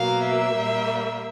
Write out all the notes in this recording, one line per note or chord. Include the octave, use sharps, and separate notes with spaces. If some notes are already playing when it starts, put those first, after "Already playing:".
Already playing: B2 F#3 A#3 F5
E5
A#2 G3 A#3